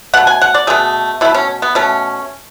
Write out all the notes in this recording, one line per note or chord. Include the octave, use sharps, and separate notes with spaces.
B2 A3 F#5
G#5
F#5
D5
B2 A3 G#4
B2 A3 E4
C#4
B3
B2 A3 C#4